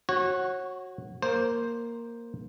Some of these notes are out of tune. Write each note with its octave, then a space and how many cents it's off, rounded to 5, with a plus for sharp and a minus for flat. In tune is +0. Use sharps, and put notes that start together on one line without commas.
F#4 +0 C#5 -30
A#3 +0 C5 +5